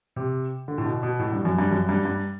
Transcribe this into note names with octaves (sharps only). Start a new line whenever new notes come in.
C3
D3
A2
B2
B2
A2
G2
F#2
G2
F#2
G2
G2